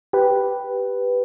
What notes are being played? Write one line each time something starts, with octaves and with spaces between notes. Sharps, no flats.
G4 B4